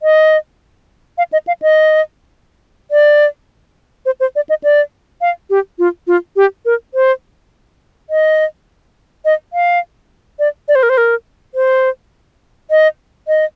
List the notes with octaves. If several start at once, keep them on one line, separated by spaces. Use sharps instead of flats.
D#5
F5
D#5
F5
D#5
D5
C5
C5
D5
D#5
D5
F5
G4
F4
F4
G4
A#4
C5
D#5
D#5
F5
D5
D5
C5
A#4
C5
A#4
C5
D#5
D#5